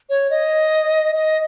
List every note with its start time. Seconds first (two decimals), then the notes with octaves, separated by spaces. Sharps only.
0.10 C#5
0.30 D#5
1.15 D#5